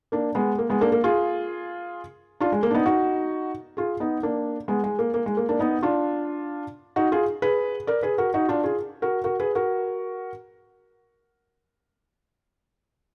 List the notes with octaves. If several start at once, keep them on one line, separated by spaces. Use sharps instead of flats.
A#3 D4
G#3 B3
A#3
G#3 B3
A#3 D4
A#3
F4 G#4
D4 F4
G#3
A#3
D4
B3 D#4
D#4 F#4
F4 G#4
B3 D#4
A#3 D4
G#3 B3
G#3
A#3
A#3
G#3
A#3
A#3 D4
B3 D#4
D4 F4
D#4 F#4
F4 G#4
G#4 B4
A#4 D5
G#4 B4
F#4 A#4
D#4 F#4
D4 F4
F4 G#4
F#4 A#4
F#4 A#4
G#4 B4
F#4 A#4